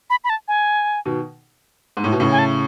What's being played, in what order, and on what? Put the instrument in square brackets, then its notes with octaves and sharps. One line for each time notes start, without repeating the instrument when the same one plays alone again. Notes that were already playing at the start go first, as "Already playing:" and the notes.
[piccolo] B5
B5
A5
G#5
[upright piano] B2 D#3
G#2
A2
B2
A2 C#3
[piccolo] G#5
A5